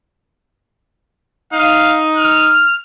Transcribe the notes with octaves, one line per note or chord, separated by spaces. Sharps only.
D#4 F5
F6